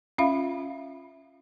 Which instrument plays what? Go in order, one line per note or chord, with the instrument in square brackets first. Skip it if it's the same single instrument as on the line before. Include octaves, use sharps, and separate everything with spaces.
[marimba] C#4 F4 E5 F5 B5